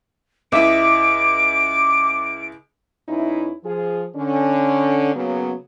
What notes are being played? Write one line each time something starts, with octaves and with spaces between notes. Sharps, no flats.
C#2 E4 D#5 E5 D6 D7
E2 C#4 D#4 E4
F3 F4 G#4
D3 C#4
C#3 F#3 A#3 B3